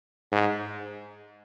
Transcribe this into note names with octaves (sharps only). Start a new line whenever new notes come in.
G#2